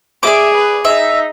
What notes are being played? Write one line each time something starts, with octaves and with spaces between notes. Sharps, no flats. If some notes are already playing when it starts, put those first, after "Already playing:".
G#4 D5 E5 D6
B4
D#4 E5